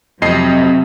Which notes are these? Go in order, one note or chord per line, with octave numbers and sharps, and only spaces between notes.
F2 C3 F#3 D#5 C7